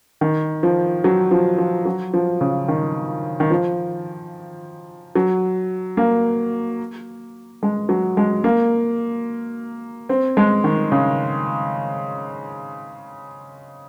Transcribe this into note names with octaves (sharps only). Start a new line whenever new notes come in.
D#3
F3
F#3
F3
F3
F#3
F3
C#3
D#3
D#3
F3
F#3
A#3
G#3
F#3
G#3
A#3
C4
G#3
D#3
C#3